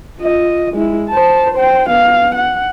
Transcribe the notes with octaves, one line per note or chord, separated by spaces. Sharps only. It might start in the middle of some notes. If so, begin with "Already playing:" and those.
F4 D#5
G#3 E4
C5 A5
C5 G5
B3 F5
F#5